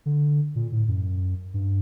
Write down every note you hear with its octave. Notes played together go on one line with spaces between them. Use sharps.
D3
A#2
A2
F#2
G2